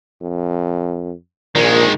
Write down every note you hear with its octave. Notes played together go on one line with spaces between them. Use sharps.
F2
A#1 A#2 D#3 G#3